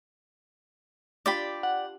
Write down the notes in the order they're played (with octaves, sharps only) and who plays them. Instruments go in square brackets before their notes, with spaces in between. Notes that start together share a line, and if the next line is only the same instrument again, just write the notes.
[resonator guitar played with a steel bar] D4 F4 G4 [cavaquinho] D5 G5 B5
[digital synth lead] F#5